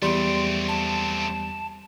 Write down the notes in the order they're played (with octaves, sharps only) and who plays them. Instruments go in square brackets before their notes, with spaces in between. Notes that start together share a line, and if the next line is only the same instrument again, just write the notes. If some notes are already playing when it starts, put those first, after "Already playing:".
[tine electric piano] E2 G3 [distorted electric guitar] A3 C4 [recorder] C6
[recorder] A5